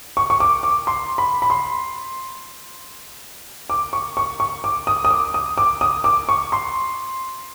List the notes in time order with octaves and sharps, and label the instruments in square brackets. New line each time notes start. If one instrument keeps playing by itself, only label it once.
[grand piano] C#6
C#6
D6
D6
C6
B5
B5
C6
D6
C#6
C#6
C#6
D6
D#6
D#6
D6
D#6
D6
D#6
D6
C#6
C6